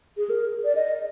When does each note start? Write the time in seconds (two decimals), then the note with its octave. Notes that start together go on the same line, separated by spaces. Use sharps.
0.17 G#4
0.30 A#4
0.65 D5
0.75 D#5